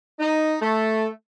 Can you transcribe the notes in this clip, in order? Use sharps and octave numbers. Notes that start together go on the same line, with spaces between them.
D#4
A3